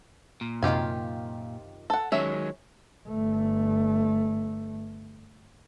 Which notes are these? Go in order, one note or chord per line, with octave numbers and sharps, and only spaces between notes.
A#2
F#2 C3 D#3 F4 G4 G#5
A4 F#5
D#3 F#3 G#3 C#4 E5
G1 A3